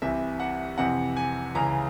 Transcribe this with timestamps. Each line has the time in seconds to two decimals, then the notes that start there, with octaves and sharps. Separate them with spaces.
0.02 C2 C3 E3 E5
0.40 F#5
0.78 F2 C3 E3 F#5
1.17 G#5
1.55 C#2 C#3 E3 A#5